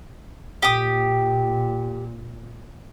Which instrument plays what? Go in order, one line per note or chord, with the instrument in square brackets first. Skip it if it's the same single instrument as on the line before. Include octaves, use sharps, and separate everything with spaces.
[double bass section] A#2 [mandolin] G4 D#6